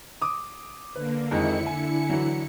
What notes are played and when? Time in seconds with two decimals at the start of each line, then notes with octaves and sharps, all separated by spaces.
0.22 D6 D#6
0.96 D3 A#3 B4
1.31 F2 D3 D#3 G#3 E4 C#7
1.66 G#5
2.10 E3 F#3